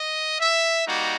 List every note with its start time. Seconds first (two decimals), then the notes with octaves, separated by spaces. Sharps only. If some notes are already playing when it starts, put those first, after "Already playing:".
Already playing: D#5
0.38 E5
0.86 G3 A#3 D#4 F#4